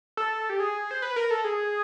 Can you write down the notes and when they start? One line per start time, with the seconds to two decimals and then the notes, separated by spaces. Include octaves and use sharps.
0.17 A4
0.50 G4
0.60 G#4
0.91 C5
1.02 B4
1.16 A#4
1.31 A4
1.44 G#4